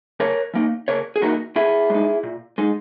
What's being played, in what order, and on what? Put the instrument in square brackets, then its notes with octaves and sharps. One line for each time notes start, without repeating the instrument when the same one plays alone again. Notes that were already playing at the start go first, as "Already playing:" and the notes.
[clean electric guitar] C#3 A#4 C#5
E3 A#3 D#4
C#3 A#4 C#5
G#4
E3 A#3 D#4 F#4 A#4
A#2 E4 G#4
G#3 D#4
A#2
G#3 D#4